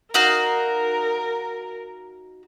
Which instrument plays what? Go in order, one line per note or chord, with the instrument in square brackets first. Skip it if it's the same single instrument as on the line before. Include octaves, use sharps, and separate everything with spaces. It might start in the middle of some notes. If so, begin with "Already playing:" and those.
[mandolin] D#4 F#4 F5 [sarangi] A#4